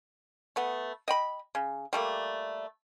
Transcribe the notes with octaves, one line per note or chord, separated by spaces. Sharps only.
A3 B3
D#5 G5 B5
C#3
G3 A3 A#3